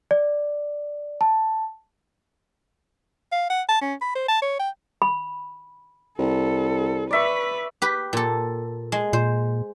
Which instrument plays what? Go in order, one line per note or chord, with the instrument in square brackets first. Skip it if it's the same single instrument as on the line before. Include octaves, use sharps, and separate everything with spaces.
[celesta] D5
A5
[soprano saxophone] F5
F#5
A5
C#4
B5
C5
A5
C#5
G5
[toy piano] B5
[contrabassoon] C2 [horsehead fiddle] A4
[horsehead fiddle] B4 [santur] D5 E5 C#6
[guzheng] G4 B4
A#2 A4
G#3
[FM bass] A#2 [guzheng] C5